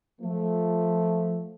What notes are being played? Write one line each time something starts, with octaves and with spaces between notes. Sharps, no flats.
F3 A3